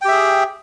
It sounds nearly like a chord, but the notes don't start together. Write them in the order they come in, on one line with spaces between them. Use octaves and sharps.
G5 G4 E5 G#4